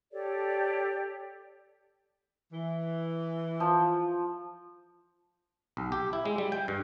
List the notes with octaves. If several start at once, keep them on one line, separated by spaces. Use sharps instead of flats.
G4 A4 C#5 D5
E3
F3
B1
G4
E4
G#3
G3
G5
G2